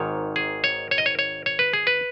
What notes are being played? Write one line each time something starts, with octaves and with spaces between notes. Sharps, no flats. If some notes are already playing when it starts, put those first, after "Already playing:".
Already playing: G#1 G#2 D#3 C#5
G#4
C#5
C#5
D#5
C#5
C#5
C#5
B4
G#4
B4